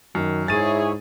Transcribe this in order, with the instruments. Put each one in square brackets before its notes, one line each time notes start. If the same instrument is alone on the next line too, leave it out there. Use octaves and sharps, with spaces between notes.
[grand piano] F#2 [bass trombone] D#3
[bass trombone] G#2 [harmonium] E4 C#5 [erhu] G#4 [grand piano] A6 D#7